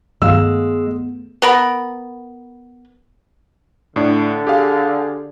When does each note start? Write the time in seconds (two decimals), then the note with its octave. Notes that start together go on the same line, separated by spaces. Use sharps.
0.22 G2 D#3 G#3 B3 F5 E6
1.42 B3 A#4 B5
3.96 A2 D3 D4
4.47 G4 G#4 F5